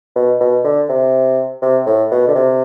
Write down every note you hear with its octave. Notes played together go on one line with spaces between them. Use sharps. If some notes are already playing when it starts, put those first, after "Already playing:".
B2
B2
D3
C3
C3
A2
B2
D3
C3